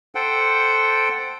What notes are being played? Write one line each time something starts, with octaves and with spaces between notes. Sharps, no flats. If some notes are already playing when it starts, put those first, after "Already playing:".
A4 C5 F#5 G5